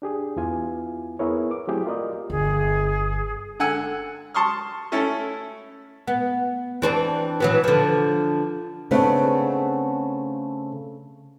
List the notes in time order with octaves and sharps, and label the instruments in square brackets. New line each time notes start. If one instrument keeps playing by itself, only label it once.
[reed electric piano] D4 G4 G#4
E2 B3 E4 F4 G#5
B3 E4 G#4 A#4 C#5
D6
F#3 A3 C4 E4 G4 G#4
F4 A#4 D5 D#5
[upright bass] G1 D3 [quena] G#4
[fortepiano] D3 F#5 G#5 E6
A5 C6 C#6 D#6 F6
A3 C#4 E4 A4
[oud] B3
E3 C4 D4
E3 F#3 B3
D3 F3
[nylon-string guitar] C#3 A3 B3 C4 D4